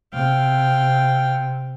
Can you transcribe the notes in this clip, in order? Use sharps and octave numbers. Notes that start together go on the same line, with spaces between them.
C3 F5 G5